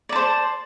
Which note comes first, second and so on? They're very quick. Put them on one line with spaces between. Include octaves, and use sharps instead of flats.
D5 A5 C5